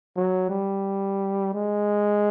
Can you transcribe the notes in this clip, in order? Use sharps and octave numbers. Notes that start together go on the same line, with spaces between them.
F#3
G3
G#3